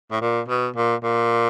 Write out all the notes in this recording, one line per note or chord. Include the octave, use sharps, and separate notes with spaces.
A2
A#2
B2
A#2
A#2